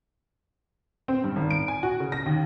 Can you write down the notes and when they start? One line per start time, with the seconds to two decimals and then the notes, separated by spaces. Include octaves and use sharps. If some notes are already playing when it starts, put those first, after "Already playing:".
1.08 C4
1.24 G2
1.36 G#1
1.50 D7
1.68 G#5
1.83 F#4
2.00 C#3
2.12 A#6
2.26 D#2